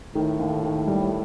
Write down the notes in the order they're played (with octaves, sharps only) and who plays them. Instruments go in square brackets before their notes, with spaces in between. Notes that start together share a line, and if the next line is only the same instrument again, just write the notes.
[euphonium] A2 [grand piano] D#3
[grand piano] D#2
D#3
G3